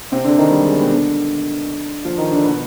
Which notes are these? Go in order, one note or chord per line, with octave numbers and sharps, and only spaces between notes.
C3 C4
D3 D4
D#3 D#4
G3
G#3
C4
B2 B3
D3 D4
F3 F4
D#3 D#4
D3 D4
B2 B3